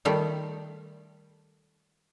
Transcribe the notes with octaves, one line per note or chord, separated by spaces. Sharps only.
D#3 G3 A3 F4